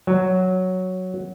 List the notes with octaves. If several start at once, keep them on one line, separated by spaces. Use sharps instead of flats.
F#3